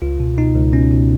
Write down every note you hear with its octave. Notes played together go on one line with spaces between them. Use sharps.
C#2 F4
B2
B2 D#4
C#2
B2 C#4
B2